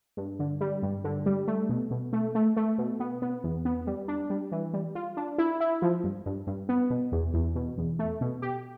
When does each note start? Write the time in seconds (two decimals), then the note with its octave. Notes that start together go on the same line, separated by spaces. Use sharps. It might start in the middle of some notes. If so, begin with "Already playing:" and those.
0.17 G2
0.39 D3
0.61 G3
0.83 G2
1.04 D3
1.26 G3
1.47 A3
1.69 B2
1.91 B2
2.13 A3
2.35 A3
2.57 A3
2.78 B2
3.00 B3
3.22 B3
3.44 E2
3.65 B3
3.87 G3
4.08 D4
4.30 G3
4.52 E3
4.73 G3
4.95 F4
5.17 D4
5.38 E4
5.60 E4
5.82 F3
6.04 G2
6.26 G2
6.47 G2
6.69 B3
6.90 B2
7.12 E2
7.34 E2
7.55 B2
7.78 E2
7.99 A3
8.21 B2
8.42 G4